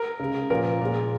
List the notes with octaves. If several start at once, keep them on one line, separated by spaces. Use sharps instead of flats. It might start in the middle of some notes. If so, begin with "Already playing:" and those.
Already playing: A#4
C#3 G#3
A#2 F3 A#3 A#4
A#2 G#3